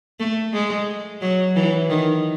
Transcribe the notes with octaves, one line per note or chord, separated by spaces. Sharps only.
A3
G#3
F#3
E3
D#3